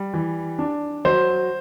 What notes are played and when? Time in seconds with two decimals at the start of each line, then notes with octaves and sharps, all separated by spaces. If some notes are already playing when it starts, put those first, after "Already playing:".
Already playing: G3
0.14 E3
0.59 D4
1.05 F#3 C5